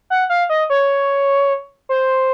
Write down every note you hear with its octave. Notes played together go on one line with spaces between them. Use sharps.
F#5
F5
D#5
C#5
C5